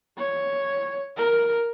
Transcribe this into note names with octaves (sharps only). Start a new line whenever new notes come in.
C#5
A#4